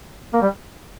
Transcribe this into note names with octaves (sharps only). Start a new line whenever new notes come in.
A#3
G3